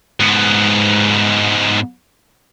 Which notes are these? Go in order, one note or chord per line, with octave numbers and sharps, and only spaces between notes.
G#2 B3